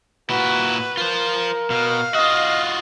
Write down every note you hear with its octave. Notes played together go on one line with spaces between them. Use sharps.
A#2 E4 F#4 B4
F4 A#4 C5
B2 F5
F4 F#4 D#5